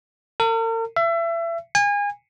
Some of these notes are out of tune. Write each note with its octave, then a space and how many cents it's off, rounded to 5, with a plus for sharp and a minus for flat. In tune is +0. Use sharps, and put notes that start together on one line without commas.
A#4 -45
E5 +30
G#5 -30